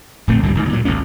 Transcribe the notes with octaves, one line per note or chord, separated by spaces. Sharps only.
D1 A#1 A3 C4
C#2 G2 D#3 G3
D2 G#2 D#3
A#2 F#3
G#1 C#2 A#3 C#4